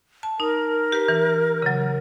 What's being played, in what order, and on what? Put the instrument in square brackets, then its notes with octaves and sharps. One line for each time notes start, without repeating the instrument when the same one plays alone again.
[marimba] A5
[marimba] D#4 [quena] A#4
[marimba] G4 B4
E3
C#3 F#3